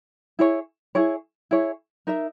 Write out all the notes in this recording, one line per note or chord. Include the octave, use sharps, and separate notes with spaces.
E4 G#4 C#5
E4 G#4 C#5
E4 G#4 C#5
D#4 A#4 E5